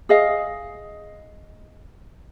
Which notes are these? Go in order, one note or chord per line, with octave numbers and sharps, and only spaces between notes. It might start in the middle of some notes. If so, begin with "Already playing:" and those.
G#4 D#5 F5